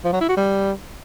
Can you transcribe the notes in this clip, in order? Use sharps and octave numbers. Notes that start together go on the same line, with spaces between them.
F3
F#3
E4
F#4
G3